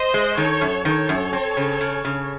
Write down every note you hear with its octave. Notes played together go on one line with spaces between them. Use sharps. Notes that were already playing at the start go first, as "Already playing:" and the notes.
Already playing: C5 D#5
G#3
D#3 A4 C#5
F#2
D#3 A4 C#5
F#2
C4
C#3
C#3
C#3